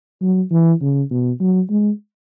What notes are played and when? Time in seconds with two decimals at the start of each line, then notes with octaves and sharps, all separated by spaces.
0.21 F#3
0.51 E3
0.81 C#3
1.10 B2
1.40 F#3
1.69 G#3